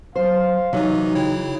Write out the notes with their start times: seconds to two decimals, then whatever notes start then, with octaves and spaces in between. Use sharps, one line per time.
0.16 F#3 C5 F5
0.73 C3 E3 F#3 D#4
1.15 C#3 E4 C#5 G5